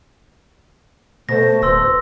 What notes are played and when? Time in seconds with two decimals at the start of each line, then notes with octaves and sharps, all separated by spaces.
1.29 B2 A3 C5 A#6
1.62 D1 B4 C6 E6 A#6